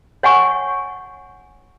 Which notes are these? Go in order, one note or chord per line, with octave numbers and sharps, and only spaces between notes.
C#5 F#5 G#5 C#6